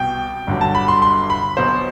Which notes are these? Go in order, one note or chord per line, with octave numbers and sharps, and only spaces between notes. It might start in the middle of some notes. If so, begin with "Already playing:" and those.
Already playing: C2 B2 G5
G1 G2 D3 F#3
A5
B5
C6
C6
B5
B1 B2 F#3 C5